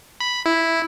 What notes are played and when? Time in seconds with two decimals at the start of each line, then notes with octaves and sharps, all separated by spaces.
0.20 B5
0.46 E4